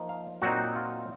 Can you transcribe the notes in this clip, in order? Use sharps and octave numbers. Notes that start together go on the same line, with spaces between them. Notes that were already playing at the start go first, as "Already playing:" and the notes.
Already playing: F3 A#3 D#4
F5
A#2 F#3 C4 D#4 F#4
F4